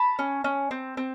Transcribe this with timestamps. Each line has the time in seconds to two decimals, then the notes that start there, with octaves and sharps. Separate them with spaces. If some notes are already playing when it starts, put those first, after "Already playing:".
Already playing: A5 B5
0.19 C#4
0.44 C#4
0.71 C4
0.97 C4